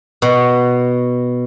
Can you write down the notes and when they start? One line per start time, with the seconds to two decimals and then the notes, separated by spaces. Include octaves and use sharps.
0.22 B2